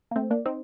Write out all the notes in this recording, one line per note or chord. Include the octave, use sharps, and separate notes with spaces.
A#3
A3 C4
A#3 D4
C4 D#4